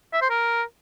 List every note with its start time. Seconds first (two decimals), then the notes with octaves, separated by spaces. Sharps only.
0.13 E5
0.22 C5
0.30 A#4